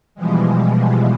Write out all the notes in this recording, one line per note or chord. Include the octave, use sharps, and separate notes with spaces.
B2 E3 F3 G3 G#3